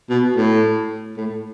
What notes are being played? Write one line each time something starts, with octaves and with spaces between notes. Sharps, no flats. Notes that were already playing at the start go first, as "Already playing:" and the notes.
B2
A2
A2